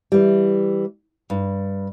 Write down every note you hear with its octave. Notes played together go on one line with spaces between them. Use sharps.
E3 G3
G2